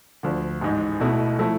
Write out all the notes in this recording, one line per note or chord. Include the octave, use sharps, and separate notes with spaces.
D2 D3 F3
A1 G#2 G#3
B1 B2 A3 E4
F3 A3 E4